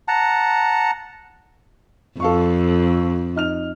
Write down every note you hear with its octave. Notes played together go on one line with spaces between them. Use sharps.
F#5 A5 A#5
F2 A4 F5 C#6
D#4 F6 F7